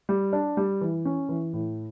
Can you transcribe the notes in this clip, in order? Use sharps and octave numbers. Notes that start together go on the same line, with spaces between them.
G3
D4
G3
E3
C#4
E3
A2